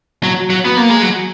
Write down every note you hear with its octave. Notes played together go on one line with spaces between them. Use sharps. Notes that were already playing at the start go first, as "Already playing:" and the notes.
F#3
F#3
B3
A#3
G#3
F#3